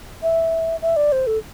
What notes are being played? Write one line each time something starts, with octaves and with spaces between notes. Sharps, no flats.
E5
E5
D5
C5
A4